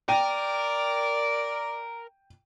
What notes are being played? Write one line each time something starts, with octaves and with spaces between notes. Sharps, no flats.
A#4 D5 G5 D#7